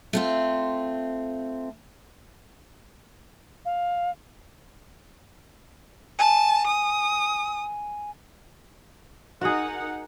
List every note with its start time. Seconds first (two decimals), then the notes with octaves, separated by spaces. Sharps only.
0.13 A3 C4 F4
3.65 F5
6.19 G#5 A5 D#7
6.67 D#6
9.41 D#4 F#4 G#4 A#4 F#5